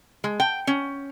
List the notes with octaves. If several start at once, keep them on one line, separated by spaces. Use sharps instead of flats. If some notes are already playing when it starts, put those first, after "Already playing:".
G#3
G5
C#4